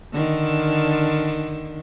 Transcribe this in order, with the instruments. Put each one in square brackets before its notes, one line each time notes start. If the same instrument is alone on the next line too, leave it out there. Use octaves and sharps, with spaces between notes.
[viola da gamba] D3 D#3